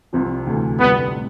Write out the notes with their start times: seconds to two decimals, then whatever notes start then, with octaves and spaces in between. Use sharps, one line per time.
0.13 C2 C3 F3 C4
0.47 D2 C3 E3 A3
0.79 G1 F2 C3 G3 B3
1.14 A2